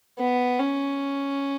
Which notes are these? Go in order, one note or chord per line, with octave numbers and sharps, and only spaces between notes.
B3
C#4